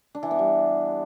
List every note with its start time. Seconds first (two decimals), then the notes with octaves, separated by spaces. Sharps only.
0.15 D4
0.23 E3
0.31 B3
0.39 G3